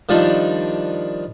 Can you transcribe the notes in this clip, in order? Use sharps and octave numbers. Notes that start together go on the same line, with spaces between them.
D#3 F3 G3 D4 D#4